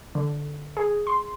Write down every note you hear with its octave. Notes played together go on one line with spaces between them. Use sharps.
D3
G#4
C6